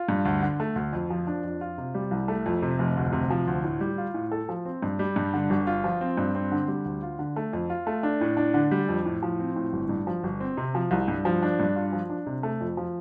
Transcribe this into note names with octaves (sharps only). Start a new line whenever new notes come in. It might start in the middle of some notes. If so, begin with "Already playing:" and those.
Already playing: F4
G2
D2
D3
A3
D2
F2
F3
D4
F2
F4
C3
G3
C2
A3
F2
C3
F1
D2
C3
F3
D2
A2
G3
F4
A2
A4
F3
C4
G2
G3
G2
D3
G1
F4
F3
C4
G2
C4
D3
G3
D2
F4
D3
A3
F2
F4
A3
D4
A2
D4
D3
G3
F2
A2
F3
C4
A2
G1
G2
F3
G1
C4
C3
F3
C2
G2
F3
D4
G2
F4
F3
D4
C3
A3
F2
F3